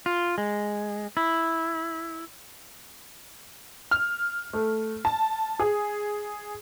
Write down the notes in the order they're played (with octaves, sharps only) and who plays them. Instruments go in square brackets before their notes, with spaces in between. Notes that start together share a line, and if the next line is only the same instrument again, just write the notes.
[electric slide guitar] F4
G#3
E4
[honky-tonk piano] F6
A3
A5
G#4